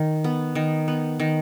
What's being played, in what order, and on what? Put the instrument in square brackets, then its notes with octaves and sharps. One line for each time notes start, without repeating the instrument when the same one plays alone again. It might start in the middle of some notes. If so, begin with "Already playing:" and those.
Already playing: [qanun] D#3
B3
D#3
B3
D#3